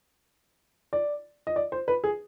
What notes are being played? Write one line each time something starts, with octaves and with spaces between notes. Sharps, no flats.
D5
D#5
D5
C5
B4
G#4